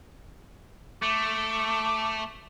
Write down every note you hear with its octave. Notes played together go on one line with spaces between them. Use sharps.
A3 D6